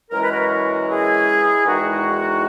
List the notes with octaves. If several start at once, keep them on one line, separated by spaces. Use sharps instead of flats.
F#2 E3 G#3 A#4
B4
F#4 A#4
E4 G#4
E2 D#3 G#3 D#4 F#4